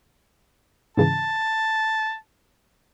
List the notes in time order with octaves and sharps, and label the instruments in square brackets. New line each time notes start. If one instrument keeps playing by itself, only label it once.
[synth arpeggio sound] G#2 C#3 E3 [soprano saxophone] A5